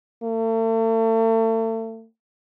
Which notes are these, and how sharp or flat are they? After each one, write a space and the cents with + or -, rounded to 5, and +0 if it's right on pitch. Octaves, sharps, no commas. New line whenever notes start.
A3 +40